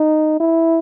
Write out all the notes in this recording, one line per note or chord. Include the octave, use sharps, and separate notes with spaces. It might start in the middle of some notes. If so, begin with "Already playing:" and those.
Already playing: D#4
E4